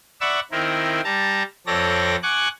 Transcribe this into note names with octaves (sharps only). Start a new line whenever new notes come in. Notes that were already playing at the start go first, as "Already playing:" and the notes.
D5 E5 F#5 B5 C#6 E6
D#3 C4 E4 A#4
G3 A5 A#5
F2 C4 A4 C#5 D5 A#6
F#5 G#5 C#6 D6 F#6